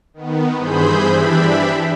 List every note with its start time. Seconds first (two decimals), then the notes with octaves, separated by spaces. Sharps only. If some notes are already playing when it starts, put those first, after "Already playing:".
0.14 D#3 B3
0.58 G2 E3 G#4 C5 B5 G6
1.09 E3 D4 G4 E5 B5